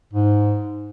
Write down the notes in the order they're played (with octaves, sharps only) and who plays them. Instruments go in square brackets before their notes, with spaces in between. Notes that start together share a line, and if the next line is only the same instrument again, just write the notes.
[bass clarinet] G#2